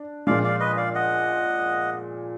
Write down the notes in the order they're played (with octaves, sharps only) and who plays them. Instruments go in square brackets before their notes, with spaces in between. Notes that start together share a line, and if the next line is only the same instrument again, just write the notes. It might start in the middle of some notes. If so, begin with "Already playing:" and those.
Already playing: [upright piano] D4
[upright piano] A#2 F3 G#3 [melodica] D5 F5
[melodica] D5 F5
B4 D#5
D5 F5
D#5 F#5